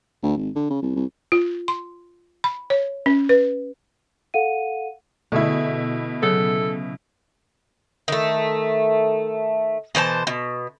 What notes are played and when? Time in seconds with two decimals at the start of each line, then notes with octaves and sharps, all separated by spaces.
0.23 D2
0.37 G#1
0.56 D3
0.70 C#3
0.82 C2
0.96 C2
1.32 F4
1.68 C6
2.44 B5
2.70 C#5
3.06 C#4
3.29 B4
4.34 A4 F5 F#5 D#7
5.32 B2 D3 A3 E4 G#4
6.23 C#3 F#3 A4 F#5
8.08 D#3 A3
9.95 B2 E3 C5 A5
10.27 B2